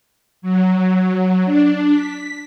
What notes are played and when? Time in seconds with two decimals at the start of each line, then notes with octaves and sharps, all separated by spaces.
0.42 F#3
1.45 D4
1.92 B6